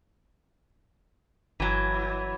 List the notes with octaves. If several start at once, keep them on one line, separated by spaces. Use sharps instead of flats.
G1 E3 F#3